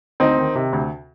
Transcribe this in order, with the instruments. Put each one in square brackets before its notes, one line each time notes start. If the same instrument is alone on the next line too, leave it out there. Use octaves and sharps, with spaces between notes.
[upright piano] D2 C4 D#4
D#3
C3
D2